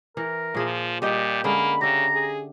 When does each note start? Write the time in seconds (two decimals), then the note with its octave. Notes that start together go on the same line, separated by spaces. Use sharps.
0.17 E3 A#4
0.55 A#2 F3 G#4
1.02 A#2 G3 G4 D#5 G5
1.44 D3 G#3 A#3 C#4 B5
1.81 C#3 G4 E5 A#5
2.13 G#4